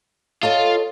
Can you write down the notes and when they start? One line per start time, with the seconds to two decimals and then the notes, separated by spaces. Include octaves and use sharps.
0.43 F4 A4 C#5 D#5